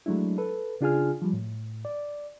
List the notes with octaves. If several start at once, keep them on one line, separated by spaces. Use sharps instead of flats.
F#3 G#3 A3 D4 E4
A4 B4
C#3 D4 F4 G#4 G#5 F6
F3 G3
A2
D5